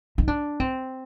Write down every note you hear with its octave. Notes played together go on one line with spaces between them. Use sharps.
D#4
D4
C4